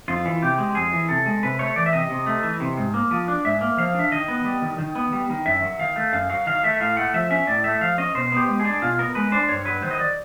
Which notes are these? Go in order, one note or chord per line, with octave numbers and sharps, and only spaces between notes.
F2 F4
E3
C3 G4
G#3
F2 G#4
E3
C3 A4
G#3
C3 B4
A3 C#5
E3 D5
E5
C3 D#5
C3
A3
E3
C3
G#2
A#3
F3
D4
G#2 E5
A#3
F3 F5
D4
E5
D#3 D#5
B3
G3
D#3
D#3
B3
G3
D#3
F#2 E5
F#3
D#3 F5
A3
F#2 F5
F#3 F5
D#3 F5
A3 E5
A2 F5
A3 F#5
F3 E5
C#4 E5
A2 D5
A3 E5
F3 F5
C#4 D#5
B2 C5
B3 G4
G#3
G#4
D4
B2 F4
B3 A#4
G#3 B4
D4 C5
G2 C#5
F#3 B4
D#3 C5
D#5
D5